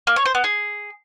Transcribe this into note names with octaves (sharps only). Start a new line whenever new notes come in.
A#3
C#5
C5
B3
G#4